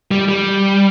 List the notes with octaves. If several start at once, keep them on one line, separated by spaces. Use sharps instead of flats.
G3
G3